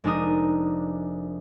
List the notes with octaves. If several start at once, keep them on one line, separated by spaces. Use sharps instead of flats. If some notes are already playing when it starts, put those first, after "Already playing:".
F1 G#3 D4 D#4 A#4 D#6